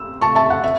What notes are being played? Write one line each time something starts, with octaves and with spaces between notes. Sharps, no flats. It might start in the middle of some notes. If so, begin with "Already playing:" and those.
Already playing: E6
A5 C#6
E5 A5
F#5
E5